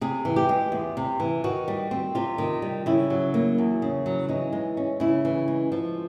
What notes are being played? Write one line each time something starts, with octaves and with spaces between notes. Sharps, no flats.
C3 G#4
E3
G4
G#3
E2
C3
E3
D#3 F#4
G3
C4
C3 F4
D#3
G3
C#3 E4
F#3
A#3
E2
C#3
F#3
E3 D#4
G#3
C#4
C#3 E4
E3
G#3
F3